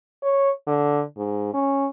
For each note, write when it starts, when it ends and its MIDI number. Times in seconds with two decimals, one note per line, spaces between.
0.22 0.50 73
0.67 1.02 50
1.17 1.52 44
1.54 1.86 61